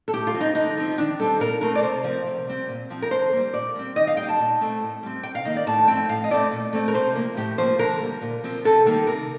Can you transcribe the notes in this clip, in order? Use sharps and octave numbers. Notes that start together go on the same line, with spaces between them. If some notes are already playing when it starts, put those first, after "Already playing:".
A4
A2 G4
F4
F3 C4
D#4
D3 D#4
F3 C4
D#3 D4
G3 C4 A4
A#2 A#4
A3 C4 A#4
D5
C3 C5
F3 C4
C3
G3 C4
A#2
F3 C4
A#4
D3 C5
G3 A#3
A#2 D5
G3 C4
D#3 D#5
F5
G3 A#3 G5
A5
A#2
A3 C4
A2
G3 C4
C3 G5
F5
D#3 A#3 D#5
D5
A2 A5
F3 A3 C4 G5
A2 F5
D#5
A3 C4 D5
A#2
A3 C4
A#4
C3 C5
F3 A#3
A2 G4
F3 A#3 C5
D3 A#4
G3 A#3
A#2
F3 C4
C3 A4
D#3 G3 A#3 A4
C3 A#4